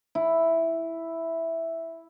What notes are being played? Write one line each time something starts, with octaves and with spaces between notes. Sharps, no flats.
E4